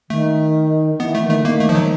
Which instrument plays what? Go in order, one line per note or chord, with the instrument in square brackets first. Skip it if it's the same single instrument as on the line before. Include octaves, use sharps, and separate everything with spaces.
[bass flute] D#3 [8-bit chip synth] A3
[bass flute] E3 [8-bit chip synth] B3
[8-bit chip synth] A3
[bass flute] D#3
[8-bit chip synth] A3
[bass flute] D3
[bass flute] D#3 [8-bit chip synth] A#3
[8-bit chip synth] A3
F3
F#3